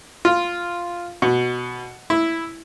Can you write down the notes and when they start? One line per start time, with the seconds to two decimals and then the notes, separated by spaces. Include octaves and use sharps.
0.25 F4
1.22 B2
2.10 E4